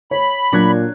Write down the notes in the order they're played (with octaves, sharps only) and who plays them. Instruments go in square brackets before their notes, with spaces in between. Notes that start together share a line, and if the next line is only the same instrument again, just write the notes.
[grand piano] C#5 [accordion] B5
[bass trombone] A#2 [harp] F#3 F#6 G#6 [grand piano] D4